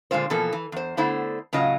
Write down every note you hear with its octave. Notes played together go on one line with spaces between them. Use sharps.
A#2 D3 G#3 F4 C5
B2 E3 F3 A#3 A4
E3
E2 C5
D3 A3 B3 E4 C5
A2 C#3 F#3 F4 D#5